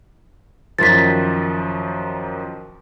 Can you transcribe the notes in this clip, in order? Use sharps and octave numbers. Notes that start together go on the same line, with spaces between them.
F#2 D#3 F3 A6 B6